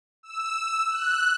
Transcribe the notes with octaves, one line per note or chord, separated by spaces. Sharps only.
E6
F#6